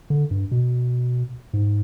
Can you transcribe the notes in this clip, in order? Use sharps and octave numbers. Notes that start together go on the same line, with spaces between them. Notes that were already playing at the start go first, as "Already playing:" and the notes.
D3
G2
B2
G#2